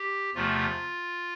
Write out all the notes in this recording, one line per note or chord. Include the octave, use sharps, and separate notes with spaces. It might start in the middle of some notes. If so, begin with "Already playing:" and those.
Already playing: G4
E2 C3 F3 A3 F4